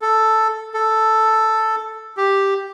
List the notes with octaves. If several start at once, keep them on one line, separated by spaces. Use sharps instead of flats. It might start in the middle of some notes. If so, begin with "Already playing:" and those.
A4
A4
G4